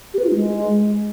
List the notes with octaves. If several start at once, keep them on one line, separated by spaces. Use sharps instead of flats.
G4
B4
F4
D#4
G#3